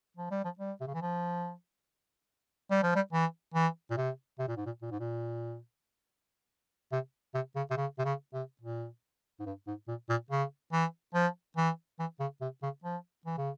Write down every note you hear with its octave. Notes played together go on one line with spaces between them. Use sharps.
F3
G3
F3
G3
C3
C#3
E3
F3
G3
F3
G3
E3
E3
A#2
C3
C3
A#2
G#2
A#2
A#2
G#2
A#2
C3
C3
C#3
C3
C#3
C3
C#3
C3
A#2
G#2
G2
G#2
A#2
A#2
C#3
E3
F3
E3
E3
C#3
C3
C#3
F3
E3
C#3